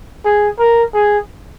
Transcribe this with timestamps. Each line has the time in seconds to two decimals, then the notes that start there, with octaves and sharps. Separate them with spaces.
0.25 G#4
0.59 A#4
0.94 G#4